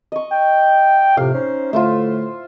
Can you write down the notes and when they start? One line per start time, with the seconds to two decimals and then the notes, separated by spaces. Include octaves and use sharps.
0.12 D#5 C#6
0.31 G5
1.17 F2 A2 C3 F5
1.35 C#4 D#4 C5
1.73 A2 D3 A3 F4 C5 E5